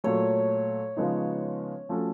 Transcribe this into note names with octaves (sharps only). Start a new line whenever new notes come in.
A#2 F#3 A3 C#5
C#3 F3 G#3 B3 D#4
F3 A3 C#4 F#4 A4